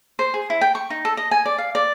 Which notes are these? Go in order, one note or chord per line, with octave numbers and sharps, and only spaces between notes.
C5
G#4
E4
G5
C#6
D#4
A4
D#5
G#5
D5
F5
D5